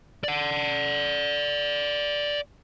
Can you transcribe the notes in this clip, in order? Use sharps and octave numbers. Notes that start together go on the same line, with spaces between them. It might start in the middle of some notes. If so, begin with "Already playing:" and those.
D5 F#5